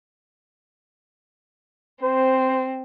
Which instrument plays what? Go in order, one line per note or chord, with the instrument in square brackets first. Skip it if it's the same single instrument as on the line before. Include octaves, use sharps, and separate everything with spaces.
[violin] C4 [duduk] C5